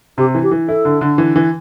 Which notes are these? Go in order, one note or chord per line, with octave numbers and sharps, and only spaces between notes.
C3 G4
E3
G4
E3
E4 A4
D3
D3
E3
E3